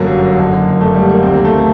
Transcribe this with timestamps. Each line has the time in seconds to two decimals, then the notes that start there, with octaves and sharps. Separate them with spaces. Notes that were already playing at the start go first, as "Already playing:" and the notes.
Already playing: G1 F#2 D3 F#3 A#3
0.38 F#1 F#2 D3
0.81 A3
0.94 G3
1.09 A#3
1.23 D2 C3 D#3 C4
1.34 A#3
1.45 A3